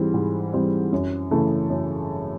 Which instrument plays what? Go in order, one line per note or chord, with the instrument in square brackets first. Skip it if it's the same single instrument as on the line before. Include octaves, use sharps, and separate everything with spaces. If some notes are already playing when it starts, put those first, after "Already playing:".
Already playing: [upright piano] G#2 E3 G3 C4
G#2
E3 G3 C4
F#2
C#3 E3 A3
F#2